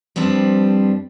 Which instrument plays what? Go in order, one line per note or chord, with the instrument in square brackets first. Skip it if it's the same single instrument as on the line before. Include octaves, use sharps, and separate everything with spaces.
[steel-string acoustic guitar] G2 F3 G3 C4 D4